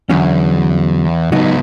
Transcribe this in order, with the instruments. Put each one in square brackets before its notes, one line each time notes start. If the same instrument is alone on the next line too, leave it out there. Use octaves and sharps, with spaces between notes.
[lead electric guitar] E2 [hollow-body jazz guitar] D3 F#3 C#4
[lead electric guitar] C#2 B3 [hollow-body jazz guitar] F#3 A3 D#4